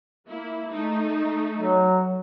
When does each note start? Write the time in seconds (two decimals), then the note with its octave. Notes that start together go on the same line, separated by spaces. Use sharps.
0.28 A#3 E4
0.71 A3 D#4
1.57 F#3